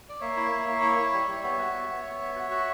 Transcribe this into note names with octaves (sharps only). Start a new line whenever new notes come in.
D5
A#3 C#5 E5
E4
A#3
A#3
E4
E4
G3
G3
B3 C#5 E5
F#4
B3
B3
B3
B3
F#4
F#4